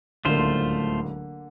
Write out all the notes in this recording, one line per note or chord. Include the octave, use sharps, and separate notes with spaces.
D1 C#2 D3 A3 A#3 F4 C5